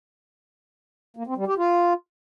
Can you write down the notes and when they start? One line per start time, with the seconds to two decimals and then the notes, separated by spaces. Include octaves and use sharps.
1.17 A#3
1.27 C4
1.37 G3
1.47 G4
1.58 F4